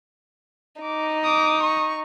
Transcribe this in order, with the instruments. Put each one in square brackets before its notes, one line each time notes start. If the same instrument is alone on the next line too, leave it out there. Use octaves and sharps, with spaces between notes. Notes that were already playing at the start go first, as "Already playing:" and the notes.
[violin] D#4 [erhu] D6
[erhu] D6 [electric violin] D#6
[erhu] C#6